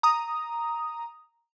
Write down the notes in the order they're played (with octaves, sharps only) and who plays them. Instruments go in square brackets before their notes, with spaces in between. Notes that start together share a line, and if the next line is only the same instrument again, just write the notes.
[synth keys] A#5 D#6